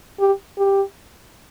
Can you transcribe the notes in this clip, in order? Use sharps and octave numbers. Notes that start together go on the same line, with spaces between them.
G4
G4